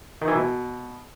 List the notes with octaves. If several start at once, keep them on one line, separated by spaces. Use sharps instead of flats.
D#3
E3
B2